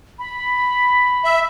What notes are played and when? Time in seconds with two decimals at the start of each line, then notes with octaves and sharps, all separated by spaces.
0.19 B5
1.24 E5